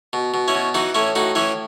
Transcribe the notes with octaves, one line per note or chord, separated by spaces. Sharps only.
B2
B2
C#4 E4
B2
E3 D#4 F#4
A2 C#4 E4
A2 D#4 F#4
E3 C#4 E4